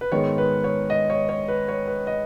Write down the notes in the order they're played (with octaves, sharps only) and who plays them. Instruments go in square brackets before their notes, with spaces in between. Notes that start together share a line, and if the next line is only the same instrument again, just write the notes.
[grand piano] B4
G#2 D#3 G#3 B3 C#5
B4
C#5
D#5
C#5
C#5
B4
C#5
B4
D#5